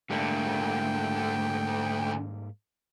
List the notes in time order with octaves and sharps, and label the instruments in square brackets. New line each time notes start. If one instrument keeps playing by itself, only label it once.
[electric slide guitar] G#2 G3 A#3 [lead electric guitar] D3 A3 [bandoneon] G5